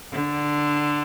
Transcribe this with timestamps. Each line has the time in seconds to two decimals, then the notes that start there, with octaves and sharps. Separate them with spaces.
0.13 D3